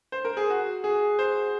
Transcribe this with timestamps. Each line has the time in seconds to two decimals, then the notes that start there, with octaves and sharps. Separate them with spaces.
0.12 C5
0.25 A#4
0.37 G#4
0.50 F#4
0.84 G#4
1.19 C5